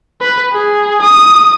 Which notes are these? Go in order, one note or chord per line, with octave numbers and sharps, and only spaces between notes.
B4
G#4
D#6